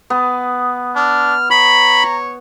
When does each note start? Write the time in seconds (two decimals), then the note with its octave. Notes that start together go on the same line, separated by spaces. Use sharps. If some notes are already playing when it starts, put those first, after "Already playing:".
0.10 B3
0.96 D4 F6
1.51 C#5 A#5 B5